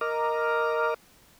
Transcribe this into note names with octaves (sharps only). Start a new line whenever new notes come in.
A#4 D#5 A#5 D6 F6